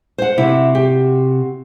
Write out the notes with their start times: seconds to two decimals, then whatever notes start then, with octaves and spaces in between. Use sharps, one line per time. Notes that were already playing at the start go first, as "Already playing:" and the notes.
0.18 C5 F#5
0.38 C3 E4 F#4
0.75 G4